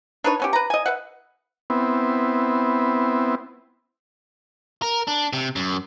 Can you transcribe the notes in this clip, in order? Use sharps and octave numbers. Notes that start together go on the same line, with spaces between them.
D4 D#4 B4 C#5
B3 C#4 G4
B4 A#5
D#5 G#5
B4 E5 F#5
B3 C4 E4
A#4
D4
C3
F#2